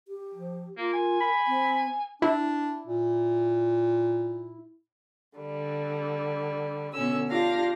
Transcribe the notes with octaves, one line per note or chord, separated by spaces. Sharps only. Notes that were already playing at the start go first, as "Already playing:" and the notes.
G4
F3
A#3 F4
A#4 G#5
B5
C4
D4 E4
A#2
D3 G3
B2 D3 C#4 E6
D4 F4 G4 F5 A#6